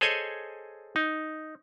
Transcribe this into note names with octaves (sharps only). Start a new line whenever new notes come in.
G#4 A4 C5 C#5 D#5 G#5
D#4